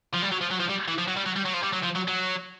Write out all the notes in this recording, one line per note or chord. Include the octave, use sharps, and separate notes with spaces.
F3
G3
F#3
F3
F#3
F3
G3
E3
F3
F#3
G3
F#3
G3
F#3
F3
G3
F#3
F3
F#3
F#3